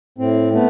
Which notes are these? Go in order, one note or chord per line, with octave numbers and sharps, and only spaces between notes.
A2 C4
A3 B3